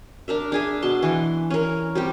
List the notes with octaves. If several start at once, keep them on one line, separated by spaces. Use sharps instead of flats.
D4 A#4 E5
D4 G#4 E5
B2 A5 C6
E3 C6
C#4 A#4
G3 C4 G4